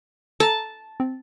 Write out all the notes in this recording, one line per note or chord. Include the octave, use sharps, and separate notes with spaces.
A4 A5 A#5
C4